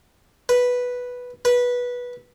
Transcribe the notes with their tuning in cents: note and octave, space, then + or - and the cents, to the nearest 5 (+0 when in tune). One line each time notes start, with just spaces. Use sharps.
B4 -5
B4 -15